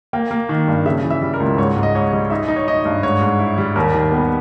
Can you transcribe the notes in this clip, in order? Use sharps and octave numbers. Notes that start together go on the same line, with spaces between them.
A#3 G5
A#3
D#3
G2
C#3 E5
E3
E5
G3
A#4
C#2
G#2 C#5
G#2
D#5
G#2 C#5
G3 D#5
D#4 E5
D#5
D#4
C#5
D#4 D#5
G2
G#2 C#5
G#2
E4
G3
D#2 A#4
D#3
B3